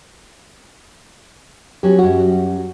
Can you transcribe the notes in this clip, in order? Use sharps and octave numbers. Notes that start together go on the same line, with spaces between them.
F#3 B3 C#4 G4
F#2 G3 F#4